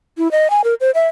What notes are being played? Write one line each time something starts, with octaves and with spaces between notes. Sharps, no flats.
E4
D#5
G#5
A#4
C5
E5